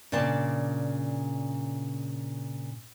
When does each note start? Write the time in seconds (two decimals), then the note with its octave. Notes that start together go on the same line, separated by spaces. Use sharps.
0.12 A#2 C#3 D4 D5 A5